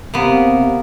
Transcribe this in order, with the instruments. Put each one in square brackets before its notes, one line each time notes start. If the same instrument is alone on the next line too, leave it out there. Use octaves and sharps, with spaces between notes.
[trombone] C3 [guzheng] A#3 B3